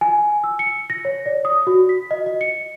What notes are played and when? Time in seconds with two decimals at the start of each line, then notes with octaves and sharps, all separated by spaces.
0.01 G#5
0.44 E6
0.59 C#7
0.90 A#6
1.05 C#5
1.26 D5
1.45 D#6
1.67 F#4
1.89 B6
2.11 D#5
2.26 D#5
2.41 C#7